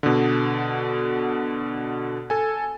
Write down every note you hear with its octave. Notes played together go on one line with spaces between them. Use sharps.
B2 D3
A4 G#5